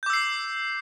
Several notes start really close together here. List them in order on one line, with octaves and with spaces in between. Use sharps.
G6 D6 E6 C7